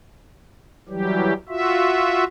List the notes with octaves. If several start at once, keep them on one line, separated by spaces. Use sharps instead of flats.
E3 F#3 G3 G4
F4 F#4 E5